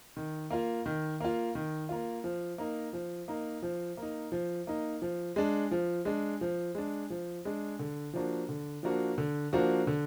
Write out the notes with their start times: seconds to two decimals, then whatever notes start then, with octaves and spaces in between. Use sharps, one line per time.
0.17 D#3
0.51 A#3 F4
0.86 D#3
1.20 A#3 F4
1.55 D#3
1.89 A#3 F4
2.24 F3
2.58 A#3 D#4
2.93 F3
3.28 A#3 D#4
3.63 F3
3.97 A#3 D#4
4.32 F3
4.67 A#3 D#4
5.02 F3
5.36 G#3 D4
5.71 F3
6.05 G#3 D4
6.41 F3
6.75 G#3 D4
7.10 F3
7.45 G#3 D4
7.79 D3
8.14 F3 A#3 D4 F#4
8.49 D3
8.83 F3 A#3 D4 F#4
9.18 D3
9.53 F3 A#3 D4 F#4
9.87 D3